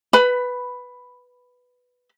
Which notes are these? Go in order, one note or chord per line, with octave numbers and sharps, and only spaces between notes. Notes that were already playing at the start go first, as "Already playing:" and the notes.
B4 B5